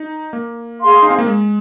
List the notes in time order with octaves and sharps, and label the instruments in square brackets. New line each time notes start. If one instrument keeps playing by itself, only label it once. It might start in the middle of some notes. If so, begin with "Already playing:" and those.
Already playing: [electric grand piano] D#4
A#3
[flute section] G#4 F5 C6
[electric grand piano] D#4
C4
A#3
G#3